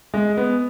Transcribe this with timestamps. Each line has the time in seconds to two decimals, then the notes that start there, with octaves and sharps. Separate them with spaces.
0.14 G#3
0.37 B3